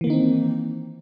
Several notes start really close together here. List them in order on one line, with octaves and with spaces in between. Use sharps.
E3 A#3 D#3 D#4 C4